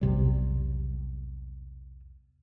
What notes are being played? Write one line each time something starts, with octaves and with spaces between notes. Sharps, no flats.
B1 E2 C3 G3